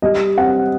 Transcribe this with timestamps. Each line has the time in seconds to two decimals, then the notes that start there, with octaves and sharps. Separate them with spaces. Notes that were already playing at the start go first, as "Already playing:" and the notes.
0.02 G3 D#5
0.38 C4 F#5